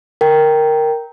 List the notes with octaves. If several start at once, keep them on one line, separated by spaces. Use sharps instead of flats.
A#4 G5